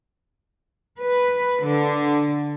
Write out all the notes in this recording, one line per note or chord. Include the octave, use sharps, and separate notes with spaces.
B4
D3